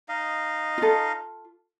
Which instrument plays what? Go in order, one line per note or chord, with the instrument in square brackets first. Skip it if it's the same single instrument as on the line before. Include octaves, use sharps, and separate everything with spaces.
[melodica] D#4 D#5 F5
[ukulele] F4 A4